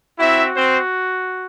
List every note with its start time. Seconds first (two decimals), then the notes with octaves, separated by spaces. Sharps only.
0.19 C4 E4 F#4 E5
0.54 C4 C5